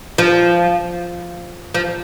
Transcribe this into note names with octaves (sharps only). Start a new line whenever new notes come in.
F3
F3